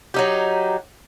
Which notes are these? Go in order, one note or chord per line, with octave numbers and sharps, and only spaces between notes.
F#3 D#4 G4